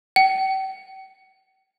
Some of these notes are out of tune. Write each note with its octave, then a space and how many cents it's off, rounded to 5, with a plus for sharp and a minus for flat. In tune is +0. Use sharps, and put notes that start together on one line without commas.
G5 -40